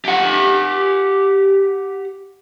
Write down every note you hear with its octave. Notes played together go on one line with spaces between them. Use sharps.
G4 F#5